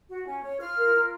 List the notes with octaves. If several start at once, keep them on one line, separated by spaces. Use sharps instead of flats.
F#4
C#4
C#5
F4 F6
A#4
F4